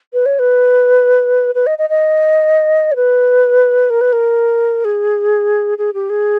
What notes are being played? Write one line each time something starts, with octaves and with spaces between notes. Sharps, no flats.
B4
C#5
B4
B4
D#5
D#5
D#5
C#5
B4
A#4
B4
A#4
G#4
G#4
G4
G#4